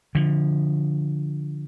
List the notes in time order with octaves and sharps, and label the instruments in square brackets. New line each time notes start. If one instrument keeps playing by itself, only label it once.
[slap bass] D3 F3